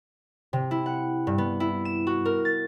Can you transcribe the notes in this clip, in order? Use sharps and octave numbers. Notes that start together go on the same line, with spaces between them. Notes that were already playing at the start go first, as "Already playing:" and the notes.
C3
E4
F#5
G2
B3
E4
E7
F#4
A#4
A6